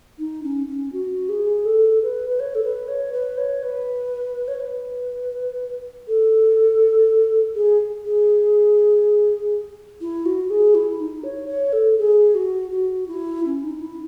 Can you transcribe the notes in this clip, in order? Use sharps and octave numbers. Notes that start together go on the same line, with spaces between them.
D#4
C#4
C#4
F#4
G#4
A4
B4
B4
C#5
A4
B4
C#5
B4
C#5
B4
C#5
B4
A4
G#4
G#4
E4
F#4
G#4
E4
D#4
C#5
C#5
A4
G#4
F#4
F#4
E4
C#4
D#4
E4